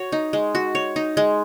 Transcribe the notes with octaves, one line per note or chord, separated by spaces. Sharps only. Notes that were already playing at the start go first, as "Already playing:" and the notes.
Already playing: F#4 C#5
D#4
G#3
F#4
C#5
D#4
G#3